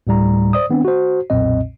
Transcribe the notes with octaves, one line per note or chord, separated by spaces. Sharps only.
D2 A2 G3 A#5
C5 D5 D#6
D#3 B3 C4 D4
F#4 C5
B1 F2 A#2 C4 D#5